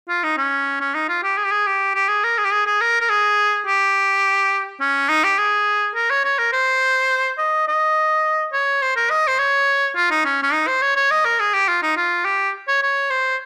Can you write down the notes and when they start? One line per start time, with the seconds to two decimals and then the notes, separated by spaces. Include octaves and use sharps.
0.09 F4
0.23 D#4
0.37 C#4
0.80 C#4
0.94 D#4
1.08 F4
1.23 G4
1.37 G#4
1.44 G4
1.51 G#4
1.67 G4
1.95 G4
2.08 G#4
2.24 A#4
2.38 G#4
2.45 G4
2.52 G#4
2.66 G#4
2.81 A#4
3.01 A#4
3.09 G#4
3.66 G4
4.80 C#4
5.09 D#4
5.24 G4
5.38 G#4
5.95 A#4
6.10 C#5
6.24 C#5
6.39 A#4
6.53 C5
7.38 D#5
7.68 D#5
8.53 C#5
8.82 C5
8.96 A#4
9.10 D#5
9.27 C5
9.39 C#5
9.96 F4
10.11 D#4
10.25 C#4
10.43 C#4
10.53 D#4
10.67 C5
10.82 C#5
10.96 C#5
11.11 D#5
11.25 A#4
11.39 G#4
11.54 G4
11.68 F4
11.83 D#4
11.97 F4
12.25 G4
12.68 C#5
12.83 C#5
13.10 C5